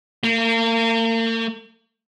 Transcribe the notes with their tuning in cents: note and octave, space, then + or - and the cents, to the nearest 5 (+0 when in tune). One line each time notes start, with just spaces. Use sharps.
A#3 -40